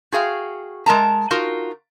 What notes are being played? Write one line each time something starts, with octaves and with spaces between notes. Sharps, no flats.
F#4 G#4 F5 G5
G#3 A#4 A5 A#5
D#4 F4 F#4 A#4